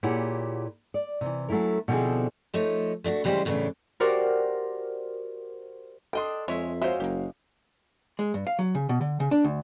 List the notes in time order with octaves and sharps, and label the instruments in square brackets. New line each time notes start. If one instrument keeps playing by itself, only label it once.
[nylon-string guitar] A#2 E4 G4 G#4 C#5 F#5
D5
C3 E3
F#3 A3 C#4 E4 A#4
B2 D3 F3 C4 E4 G#4
[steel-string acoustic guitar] F3 A3 D#4 C#5
A3 D4 F4 F#4
C#3 E3 G3 G#3 G4 C5
F#2 A2 C#3 E3 B3 D4
[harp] F#4 G4 A#4 C5 D5
[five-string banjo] D4 D#5 G5 [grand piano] A4 C6
[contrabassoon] F2 [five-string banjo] G#3 [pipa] C#5 E5
[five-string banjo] G#3 E5 [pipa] A#3 C5 [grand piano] F#4 C#5 F5
[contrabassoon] F#1 [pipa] A#3 G4
[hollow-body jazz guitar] G#3
G2
F5
F#3
C#3
B2
D3
C#3
D4
D2